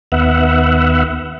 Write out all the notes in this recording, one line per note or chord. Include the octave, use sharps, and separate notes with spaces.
D#2 B3 E5 F#5